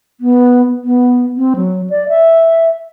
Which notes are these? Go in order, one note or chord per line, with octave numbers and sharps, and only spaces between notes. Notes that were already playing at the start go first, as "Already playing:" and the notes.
B3
B3
C4
F#3
D5
E5